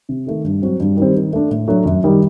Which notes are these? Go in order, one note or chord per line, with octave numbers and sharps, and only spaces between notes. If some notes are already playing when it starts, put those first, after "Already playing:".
C3
D#3 A3
G2
F#3 C4 F#4
G2
D#3 G3 C4
D#3
A3 D4
A2
F#3 A3 D4 F#4
F#2
D#3 G3